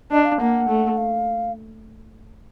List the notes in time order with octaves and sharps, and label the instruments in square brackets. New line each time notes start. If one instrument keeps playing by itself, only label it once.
[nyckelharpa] D4 [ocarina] D#5
[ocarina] F5
[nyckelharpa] A#3 [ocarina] F#5
[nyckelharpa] A3
[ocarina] F5